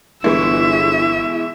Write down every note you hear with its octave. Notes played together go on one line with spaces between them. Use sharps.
G1 B2 E3 G#3 E4 E5